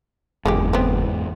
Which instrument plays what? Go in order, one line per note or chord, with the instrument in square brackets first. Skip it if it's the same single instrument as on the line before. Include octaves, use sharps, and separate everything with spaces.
[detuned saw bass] F#1 [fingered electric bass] E2 G#2 [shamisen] D#3 G#3 G4
[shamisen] B3 C4